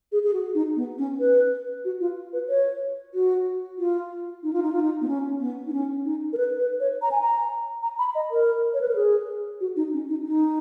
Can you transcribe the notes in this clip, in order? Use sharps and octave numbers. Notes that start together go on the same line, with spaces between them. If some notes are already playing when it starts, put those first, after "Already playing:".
G#4
G#4
F#4
D#4
B3
C#4
B4
F#4
F4
B4
C#5
F#4
F4
D#4
F4
D#4
F4
D#4
B3
C#4
B3
D#4
C#4
D#4
A#4
B4
B4
C#5
A#5
G#5
A#5
A#5
B5
D#5
A#4
C#5
B4
A#4
G#4
F#4
D#4
C#4
D#4
D#4